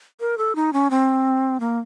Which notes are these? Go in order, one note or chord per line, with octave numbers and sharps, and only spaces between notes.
A#4
A4
D#4
C#4
C4
A#3